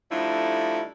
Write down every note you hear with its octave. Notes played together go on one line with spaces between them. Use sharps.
D3 F3 G3 A3 D#4 E4